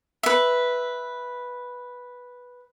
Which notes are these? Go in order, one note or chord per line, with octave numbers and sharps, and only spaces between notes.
B4 E5